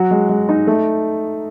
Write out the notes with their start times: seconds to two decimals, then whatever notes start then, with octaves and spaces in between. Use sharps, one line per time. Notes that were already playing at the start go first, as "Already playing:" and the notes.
Already playing: F#3 F#4
0.11 G#3
0.29 G#3
0.49 D#4
0.67 A3